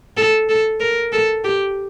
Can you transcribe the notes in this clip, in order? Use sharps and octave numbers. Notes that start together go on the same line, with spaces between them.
A4
A4
A#4
A4
G4